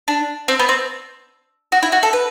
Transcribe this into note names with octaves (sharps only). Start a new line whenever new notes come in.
D4
C4
B3
C4
F#4
E4
F#4
A4
B4